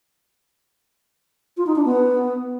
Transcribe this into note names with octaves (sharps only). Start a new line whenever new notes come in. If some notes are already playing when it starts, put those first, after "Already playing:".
F4
D#4
D4
B3